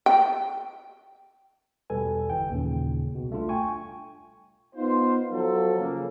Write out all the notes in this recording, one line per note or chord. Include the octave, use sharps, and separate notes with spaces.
G5
E2 B2 G3 A4 B4 G#5
G1 E3 G5
D#2 A#2 C#3
C2 B2
G3 A3 D4 F4
G5 G#5 C#6
B3 D#4 F4 C5
F3 F#3 A4
C#3 A#3